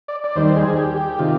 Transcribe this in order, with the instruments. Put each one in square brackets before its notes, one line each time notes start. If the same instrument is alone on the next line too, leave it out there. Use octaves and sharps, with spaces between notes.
[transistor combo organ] D5
D5
D#2 D#3 G3 C5
G#4
G4
G4
C3 D#3 F4